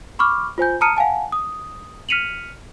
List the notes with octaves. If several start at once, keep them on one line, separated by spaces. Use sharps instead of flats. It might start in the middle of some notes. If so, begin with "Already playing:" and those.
B5 C#6 D6 F6
F4 C5 G#5 G6
A5 A#5 D#6 F6 C#7 D#7
F5 F#5 G#5 A5
D#6
F6 B6 C#7 D#7 F7 F#7